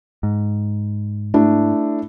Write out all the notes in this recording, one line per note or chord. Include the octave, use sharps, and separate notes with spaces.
G#2
A3 D4 E4